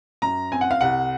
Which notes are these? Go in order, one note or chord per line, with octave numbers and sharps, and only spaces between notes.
F#2 A#5
C4 G#5
F#5
F5
C2 F#5